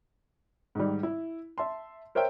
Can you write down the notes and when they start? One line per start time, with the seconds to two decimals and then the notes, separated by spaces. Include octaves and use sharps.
0.75 G#2 D#3 G3
1.03 E4
1.58 E5 A5 C6
2.15 A#4 C5 C#5 E5 G5